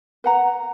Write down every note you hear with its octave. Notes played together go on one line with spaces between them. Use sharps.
B4 F#5 A#5